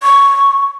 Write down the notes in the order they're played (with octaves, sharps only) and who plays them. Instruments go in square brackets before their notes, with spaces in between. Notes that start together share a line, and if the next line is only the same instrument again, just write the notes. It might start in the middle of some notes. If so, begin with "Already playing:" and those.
[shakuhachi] C#6